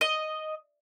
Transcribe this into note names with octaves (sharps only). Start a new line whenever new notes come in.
D#5